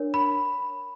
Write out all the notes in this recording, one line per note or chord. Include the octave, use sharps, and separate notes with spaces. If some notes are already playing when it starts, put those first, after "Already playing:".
Already playing: D4 A#4 C#5
B5